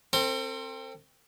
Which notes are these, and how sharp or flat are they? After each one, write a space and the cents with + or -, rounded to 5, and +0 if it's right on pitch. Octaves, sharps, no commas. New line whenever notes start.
C4 +15 A4 +45